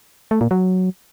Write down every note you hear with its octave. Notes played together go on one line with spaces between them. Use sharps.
A3
A#2
F#3